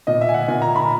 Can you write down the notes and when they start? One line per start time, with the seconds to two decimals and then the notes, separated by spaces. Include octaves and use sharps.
0.07 A#2 D#5
0.21 E5
0.29 G#5
0.34 F#5
0.48 A#2 G#5
0.62 A#5
0.76 B5